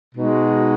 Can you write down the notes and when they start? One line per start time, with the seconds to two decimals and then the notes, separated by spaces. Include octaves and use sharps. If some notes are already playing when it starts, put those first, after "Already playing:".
0.14 B2 G#3 D#4 F#4